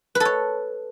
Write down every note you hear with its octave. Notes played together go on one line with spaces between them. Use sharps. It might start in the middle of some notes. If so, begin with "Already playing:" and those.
B4
A4
C#5